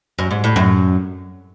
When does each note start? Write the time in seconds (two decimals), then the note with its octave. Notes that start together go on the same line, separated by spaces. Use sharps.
0.19 F#2
0.31 G#2
0.44 A2
0.56 F#2